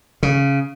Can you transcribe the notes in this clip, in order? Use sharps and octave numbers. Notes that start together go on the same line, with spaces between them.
C#3